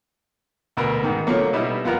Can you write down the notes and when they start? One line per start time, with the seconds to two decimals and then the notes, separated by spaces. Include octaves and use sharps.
0.77 D2 B2 A#4 B4 A#5 E6
1.03 G#2 D#3
1.27 D3 F3 F#3 A3 A#3
1.53 B2 G3 D#4 E4
1.85 F2 F3 B3 A#4 F#5 A#5